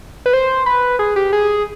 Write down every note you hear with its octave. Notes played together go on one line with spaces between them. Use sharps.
B4
C5
B4
G#4
G4
G#4